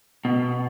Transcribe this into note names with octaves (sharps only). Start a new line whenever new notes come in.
B2